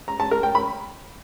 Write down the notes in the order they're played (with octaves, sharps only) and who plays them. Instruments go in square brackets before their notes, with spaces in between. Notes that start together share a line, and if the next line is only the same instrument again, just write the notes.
[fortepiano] A#5
A5
A#4
G5
B5